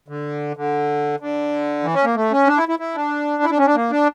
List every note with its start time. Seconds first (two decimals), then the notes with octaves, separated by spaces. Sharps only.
0.08 D3
0.57 D3
1.20 D3
1.84 E3
1.94 C#4
2.04 A#3
2.16 A3
2.31 C#4
2.47 D4
2.57 E4
2.69 E4
2.79 E4
2.95 D4
3.43 E4
3.51 D4
3.58 C#4
3.66 D4
3.75 A#3
3.91 D4